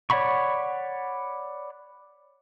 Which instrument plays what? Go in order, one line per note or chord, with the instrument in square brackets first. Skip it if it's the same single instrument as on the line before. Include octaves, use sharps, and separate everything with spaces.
[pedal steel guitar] C#5 D5 F#5 B5 C#6